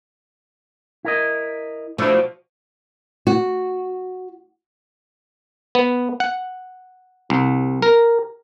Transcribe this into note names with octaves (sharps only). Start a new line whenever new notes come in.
E4 A#4 D#5
B2 F3 A3 D4 E4
F#4
B3
F#5
C2
A#4